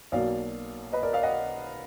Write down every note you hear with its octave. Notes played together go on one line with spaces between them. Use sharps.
B1 B2 A#3 D5 F5
B4 D#5
A#4 D5
D5 F5
D#5 F#5